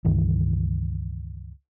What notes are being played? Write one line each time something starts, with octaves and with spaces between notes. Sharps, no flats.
C#2 G2 D#3 E3